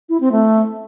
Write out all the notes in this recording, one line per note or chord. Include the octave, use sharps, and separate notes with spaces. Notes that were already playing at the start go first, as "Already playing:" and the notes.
E4
C4
A3